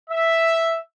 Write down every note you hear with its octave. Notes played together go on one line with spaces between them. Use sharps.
E5